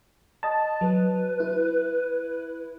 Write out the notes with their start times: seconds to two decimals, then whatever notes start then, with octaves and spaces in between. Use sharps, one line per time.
0.43 D#5 A5
0.81 F#3 B4
1.40 E4